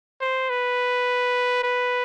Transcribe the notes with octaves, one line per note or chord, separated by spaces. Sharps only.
C5
B4
B4